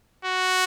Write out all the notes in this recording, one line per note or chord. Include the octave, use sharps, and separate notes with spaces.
F#4